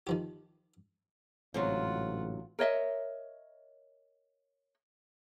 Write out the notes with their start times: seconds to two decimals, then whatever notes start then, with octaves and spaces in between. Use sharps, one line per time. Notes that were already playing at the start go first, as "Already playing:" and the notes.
0.07 D#3 F3 G4
1.54 A1 G#2 C3 F#3 F4 F#5
2.59 A#4 C#5 D#5 E5